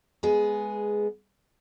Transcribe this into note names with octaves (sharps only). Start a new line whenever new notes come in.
G#3 B3 G#4